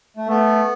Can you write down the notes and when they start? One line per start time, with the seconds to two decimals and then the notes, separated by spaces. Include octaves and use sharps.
0.17 A3
0.28 A3 B3